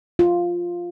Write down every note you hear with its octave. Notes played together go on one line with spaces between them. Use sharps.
F4